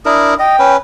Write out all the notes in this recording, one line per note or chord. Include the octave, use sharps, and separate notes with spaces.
D4 E4 A#4 D#6
D#5 G5
C#4 B4